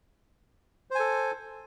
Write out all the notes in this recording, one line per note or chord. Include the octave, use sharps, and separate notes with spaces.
A4 C5 G#5